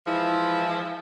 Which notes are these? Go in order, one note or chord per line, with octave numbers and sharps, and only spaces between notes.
E3 F3 G#3 E4